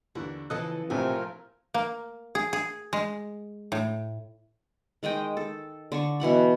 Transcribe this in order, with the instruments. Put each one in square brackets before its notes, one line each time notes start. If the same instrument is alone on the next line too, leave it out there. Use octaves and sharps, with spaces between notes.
[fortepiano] D#2 E3 [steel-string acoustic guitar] D3
[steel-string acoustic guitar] C#3 E3 F3 [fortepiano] A4 D#5 F#6
[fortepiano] A#1 A2 E3 [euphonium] C3 [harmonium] F3 F4 A#4 [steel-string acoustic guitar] G#5
[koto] A#3
G#4
G#4
G#3
A2
[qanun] D#3 G#3 D#5 G5
A4
D3 A5 C#6
B2 E3 F#5 B5